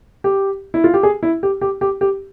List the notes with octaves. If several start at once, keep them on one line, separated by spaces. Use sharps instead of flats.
G4
E4
F4
G4
G#4
E4
G4
G4
G4
G4